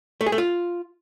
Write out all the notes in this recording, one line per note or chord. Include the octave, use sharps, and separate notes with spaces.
A3
G#4
A3
F4